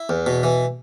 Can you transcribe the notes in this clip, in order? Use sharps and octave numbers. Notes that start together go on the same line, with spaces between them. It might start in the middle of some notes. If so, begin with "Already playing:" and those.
Already playing: E4
E2
B2
E3